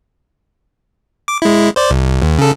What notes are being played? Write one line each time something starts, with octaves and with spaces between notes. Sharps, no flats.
D6
G#3 E4
C5 D5
C2
D#2
C#3 A4